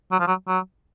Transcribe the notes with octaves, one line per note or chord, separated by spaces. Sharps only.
F#3
F3
F#3
F#3